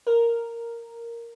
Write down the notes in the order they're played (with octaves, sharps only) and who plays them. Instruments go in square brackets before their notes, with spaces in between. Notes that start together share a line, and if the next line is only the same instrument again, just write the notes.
[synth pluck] A#4